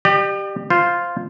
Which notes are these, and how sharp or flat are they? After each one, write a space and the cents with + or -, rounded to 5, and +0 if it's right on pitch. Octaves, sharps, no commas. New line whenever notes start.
G4 +0 D5 +45
F4 +0 C5 +0